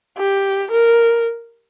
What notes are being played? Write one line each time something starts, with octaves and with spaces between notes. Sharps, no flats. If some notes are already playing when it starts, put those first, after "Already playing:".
G4
A#4